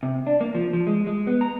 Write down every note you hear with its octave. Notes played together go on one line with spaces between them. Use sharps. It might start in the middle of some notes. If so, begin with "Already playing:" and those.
C3
D4
A#3
F3
F3
G#3
G#3
B3
A#5